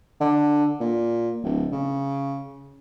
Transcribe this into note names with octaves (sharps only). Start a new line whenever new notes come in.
D3
A#2
D1
C#3